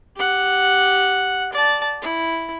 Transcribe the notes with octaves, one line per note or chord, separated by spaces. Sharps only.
G4 F#5
D5 A5
E4